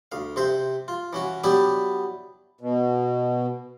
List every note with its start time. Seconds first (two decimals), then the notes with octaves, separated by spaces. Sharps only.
0.12 D2 F5
0.36 C3 C5 E5
0.88 F4
1.13 E3 C#4 F#4
1.44 F#3 B3 D4 E4 G4 E5
2.61 B2